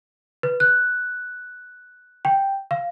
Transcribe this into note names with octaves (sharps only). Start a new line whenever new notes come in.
B4
F#6
G5
F5